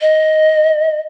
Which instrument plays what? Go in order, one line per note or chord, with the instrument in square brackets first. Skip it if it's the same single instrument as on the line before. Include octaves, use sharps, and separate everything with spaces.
[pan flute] D#5